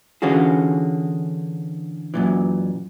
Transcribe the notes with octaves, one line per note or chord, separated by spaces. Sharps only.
D3 E3 C#4 F4 F#4 G#4
F#2 A#2 E3